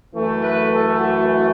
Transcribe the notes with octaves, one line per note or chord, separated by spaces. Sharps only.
F#2 E3 A3
B4
A4
F#4